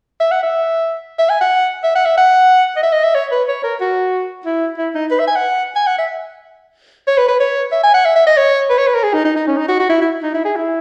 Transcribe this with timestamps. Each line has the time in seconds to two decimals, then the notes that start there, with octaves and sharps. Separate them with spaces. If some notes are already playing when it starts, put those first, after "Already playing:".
0.20 E5
0.31 F#5
0.43 E5
1.19 E5
1.30 G#5
1.41 F#5
1.84 E5
1.96 F#5
2.05 E5
2.18 F#5
2.76 D#5
2.83 E5
2.93 D#5
3.04 E5
3.15 C#5
3.32 B4
3.48 C#5
3.64 A#4
3.81 F#4
4.46 E4
4.78 E4
4.95 D#4
5.11 B4
5.19 E5
5.27 G#5
5.35 F#5
5.76 G#5
5.87 F#5
5.98 E5
7.08 C#5
7.17 B4
7.28 B4
7.40 C#5
7.72 E5
7.83 G#5
7.94 F#5
8.05 E5
8.16 E5
8.27 D#5
8.37 C#5
8.70 B4
8.78 C#5
8.87 B4
8.95 A#4
9.03 G#4
9.13 D#4
9.25 D#4
9.36 D#4
9.47 C#4
9.57 D#4
9.68 F#4
9.80 F#4
9.89 E4
10.02 E4
10.23 D#4
10.34 E4
10.45 G#4
10.56 E4